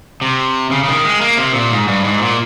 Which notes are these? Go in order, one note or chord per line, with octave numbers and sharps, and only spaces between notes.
C3
C#3
C#3
D#3
G#3
A#3
C3
A#2
G#2
G2
G#2
A#2